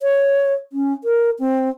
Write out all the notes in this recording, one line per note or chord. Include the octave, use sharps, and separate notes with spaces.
C#5
C#4
A#4
C4